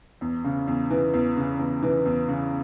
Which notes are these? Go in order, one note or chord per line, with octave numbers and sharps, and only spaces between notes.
E2
C#3
E2
E3
E2
C#3
E2
E3
E2
C#3